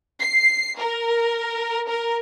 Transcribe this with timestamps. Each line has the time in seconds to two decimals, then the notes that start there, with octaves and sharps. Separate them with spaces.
0.20 C7
0.79 A#4
1.88 A#4